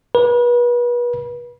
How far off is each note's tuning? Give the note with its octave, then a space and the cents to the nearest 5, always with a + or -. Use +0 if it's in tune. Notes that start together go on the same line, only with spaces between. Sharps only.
B4 -35